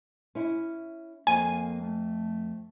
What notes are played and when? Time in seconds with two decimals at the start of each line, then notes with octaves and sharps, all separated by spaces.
0.35 C#4 E4
1.27 F2 A#3 G#5
1.81 A3